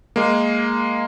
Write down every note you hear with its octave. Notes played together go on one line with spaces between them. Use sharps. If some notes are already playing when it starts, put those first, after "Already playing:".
G#3 A#3